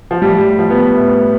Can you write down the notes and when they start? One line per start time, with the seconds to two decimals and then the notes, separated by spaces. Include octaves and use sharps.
0.11 F3
0.22 A2 G3
0.59 F3
0.70 B3
0.94 A2